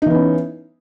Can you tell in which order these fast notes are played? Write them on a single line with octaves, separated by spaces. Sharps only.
D#4 E3 B3 C#4